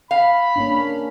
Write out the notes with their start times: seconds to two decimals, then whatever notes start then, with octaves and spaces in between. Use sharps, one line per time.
0.11 F5 B5
0.56 A#3 C#4 D4